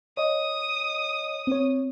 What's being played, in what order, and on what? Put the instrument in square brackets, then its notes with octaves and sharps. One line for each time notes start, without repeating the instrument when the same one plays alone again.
[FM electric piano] C#5 D#5 [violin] D#6
[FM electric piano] C4 C#5